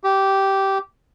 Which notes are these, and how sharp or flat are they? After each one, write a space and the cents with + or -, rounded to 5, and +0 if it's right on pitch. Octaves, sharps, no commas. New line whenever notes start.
G4 -15